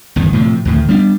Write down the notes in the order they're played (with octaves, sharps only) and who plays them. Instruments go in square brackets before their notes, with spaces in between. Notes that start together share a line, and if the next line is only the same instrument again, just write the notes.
[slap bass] G1 E2 D#3
A2 C3 F3
D2 A2 D#3
G3 B3 D4